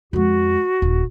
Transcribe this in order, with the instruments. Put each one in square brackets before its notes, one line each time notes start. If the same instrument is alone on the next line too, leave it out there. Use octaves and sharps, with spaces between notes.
[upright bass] F2 G#3 [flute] F#4
[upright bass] D#1